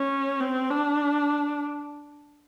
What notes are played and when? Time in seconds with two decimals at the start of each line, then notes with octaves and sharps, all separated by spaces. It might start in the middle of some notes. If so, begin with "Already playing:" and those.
Already playing: C#4
0.40 C4
0.70 D4